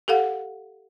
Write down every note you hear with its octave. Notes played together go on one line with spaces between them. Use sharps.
G4 A4 F5 F#5